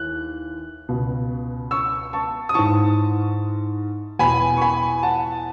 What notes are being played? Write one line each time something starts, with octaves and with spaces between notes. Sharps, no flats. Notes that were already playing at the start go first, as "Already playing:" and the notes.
Already playing: D#2 E3 F#6
C#2 B2
C#6 E6
A5 C#6
D#6
G#2 E3 A5 C#6
E2 B2 G#5 B5
C#6
G#5 B5
F#5 A5